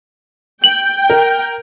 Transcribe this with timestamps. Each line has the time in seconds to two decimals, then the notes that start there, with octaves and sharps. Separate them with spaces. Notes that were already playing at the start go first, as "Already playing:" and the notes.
0.64 G5 F#7
1.10 A#4